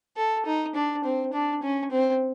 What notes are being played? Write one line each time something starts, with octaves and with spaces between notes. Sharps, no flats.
A4
D#4
D4
C4
D4
C#4
C4